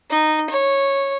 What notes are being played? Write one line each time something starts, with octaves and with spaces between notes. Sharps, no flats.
D#4
C#5